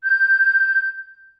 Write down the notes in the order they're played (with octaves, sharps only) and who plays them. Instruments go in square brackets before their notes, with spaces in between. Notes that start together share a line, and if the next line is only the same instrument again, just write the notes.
[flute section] G6